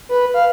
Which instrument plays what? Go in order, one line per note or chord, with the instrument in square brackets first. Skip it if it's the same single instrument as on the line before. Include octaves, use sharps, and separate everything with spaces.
[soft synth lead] B4
F5